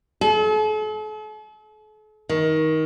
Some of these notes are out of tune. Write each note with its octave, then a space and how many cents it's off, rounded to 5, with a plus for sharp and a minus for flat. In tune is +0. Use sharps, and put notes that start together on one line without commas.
A4 -45
D#3 +20